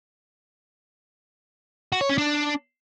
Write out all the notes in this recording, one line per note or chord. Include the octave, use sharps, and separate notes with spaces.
F#4
C#5
C#4
D4